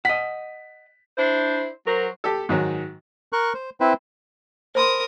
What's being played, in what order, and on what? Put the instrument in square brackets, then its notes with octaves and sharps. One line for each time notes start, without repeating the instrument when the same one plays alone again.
[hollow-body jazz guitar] D#5 F#5 [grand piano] B6
[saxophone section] D4 E4 C5
F#3 F#4 A#4 C5
[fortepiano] G4 A4
G#2 D#3 F#3
[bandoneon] A#4 C#6 F#6
C5
C4 E4 B4 C5
[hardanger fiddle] A#4 D#6 [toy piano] C5 B5 C6